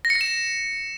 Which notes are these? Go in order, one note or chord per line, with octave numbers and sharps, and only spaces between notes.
A#6
C#7
A#6
E7
A#6